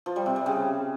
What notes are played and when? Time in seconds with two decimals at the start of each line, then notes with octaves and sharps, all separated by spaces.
0.06 F3
0.16 G3
0.26 C3
0.36 G3
0.46 C#3